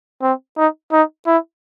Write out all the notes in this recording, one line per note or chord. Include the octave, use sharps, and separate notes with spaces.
C4
D#4
D#4
E4